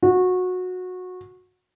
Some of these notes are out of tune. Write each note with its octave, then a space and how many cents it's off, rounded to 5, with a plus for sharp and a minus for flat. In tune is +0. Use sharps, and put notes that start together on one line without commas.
F#4 -20